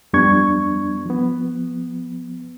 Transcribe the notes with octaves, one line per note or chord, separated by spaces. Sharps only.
F2 G3 B3 D4 C#6 G#6
F3 B3